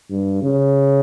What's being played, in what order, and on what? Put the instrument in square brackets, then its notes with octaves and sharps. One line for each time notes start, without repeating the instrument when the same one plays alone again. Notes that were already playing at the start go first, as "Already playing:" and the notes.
[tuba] G2
C#3